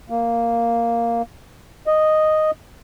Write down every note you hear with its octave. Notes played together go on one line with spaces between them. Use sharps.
A#3
D#5